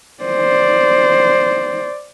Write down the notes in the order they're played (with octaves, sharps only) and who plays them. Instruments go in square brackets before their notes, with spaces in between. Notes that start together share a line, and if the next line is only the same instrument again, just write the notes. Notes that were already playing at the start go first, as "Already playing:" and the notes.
[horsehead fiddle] C5 D5